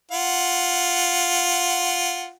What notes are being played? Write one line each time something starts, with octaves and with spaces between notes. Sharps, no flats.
F4 F#5